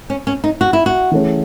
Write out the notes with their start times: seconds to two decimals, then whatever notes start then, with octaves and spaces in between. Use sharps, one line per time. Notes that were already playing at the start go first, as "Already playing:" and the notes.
0.10 C#4
0.27 C#4
0.44 D#4
0.61 F#4
0.73 E4
0.86 F#4
1.11 E3 A3 C#4 G#4